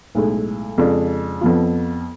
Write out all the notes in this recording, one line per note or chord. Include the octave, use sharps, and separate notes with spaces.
B1 A2 G#3
F2 C#3 G#3 D4 F4
F2 F3 B3 F4